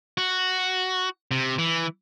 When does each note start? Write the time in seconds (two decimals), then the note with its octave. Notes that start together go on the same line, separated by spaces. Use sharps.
0.18 F#4
1.31 C3
1.59 E3